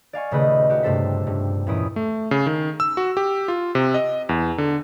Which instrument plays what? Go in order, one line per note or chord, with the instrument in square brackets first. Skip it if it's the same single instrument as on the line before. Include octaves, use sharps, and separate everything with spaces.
[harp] D5 F5 G#5 C#6
D#1 C#3 A3 G4 B4 D#5
F#4 G4
G2 C3 A3 A4 C5 B6
G2
E2 A#2 C#4 E4 D#6 D7
[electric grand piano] A3
C#3
D#3
E6
F#4
G4
F4
C3
D#5
E2
D3